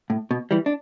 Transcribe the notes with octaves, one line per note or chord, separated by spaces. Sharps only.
A2
B2
E3 G3
D4